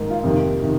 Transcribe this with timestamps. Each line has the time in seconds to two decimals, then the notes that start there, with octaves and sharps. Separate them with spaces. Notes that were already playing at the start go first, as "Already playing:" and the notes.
Already playing: G#2 D#3 A#3 D#4
0.10 F4
0.24 F2 C3 D#3 A#3
0.63 C3 D#3